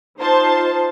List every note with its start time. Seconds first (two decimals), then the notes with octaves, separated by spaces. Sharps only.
0.19 D#4 F4 C5 A5 C6